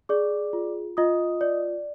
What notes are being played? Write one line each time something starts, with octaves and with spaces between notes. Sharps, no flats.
G#4 D5 D6
F4
F4 D#5 D#6
D5